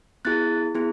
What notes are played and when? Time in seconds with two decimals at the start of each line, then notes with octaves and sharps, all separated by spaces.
0.25 B3 E4 G#4 F#6 A6
0.75 B3 E4 G#4